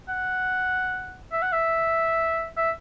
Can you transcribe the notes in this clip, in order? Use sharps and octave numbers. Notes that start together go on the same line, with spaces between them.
F#5
E5
F#5
E5
E5